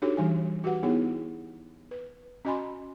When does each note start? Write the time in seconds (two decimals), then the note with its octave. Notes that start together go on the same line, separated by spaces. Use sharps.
0.02 D4 D#4 F#4 G4 A4 C#5
0.17 E3 G3 G#5
0.64 F#4 G4 B4 F#5
0.83 B3 D#4 E4 G#4 C#5
1.91 B4
2.45 C#4 F#4 D#5 G#5 B5 C6